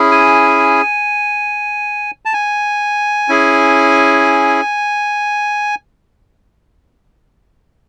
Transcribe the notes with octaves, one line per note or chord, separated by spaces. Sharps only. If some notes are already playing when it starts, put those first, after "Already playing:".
Already playing: C#4 E4 G#4
G#5
A5
G#5
C#4 E4 G#4